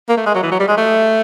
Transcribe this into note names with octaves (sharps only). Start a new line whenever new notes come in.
A#3
A3
G#3
F#3
E3
F#3
G3
G#3
A3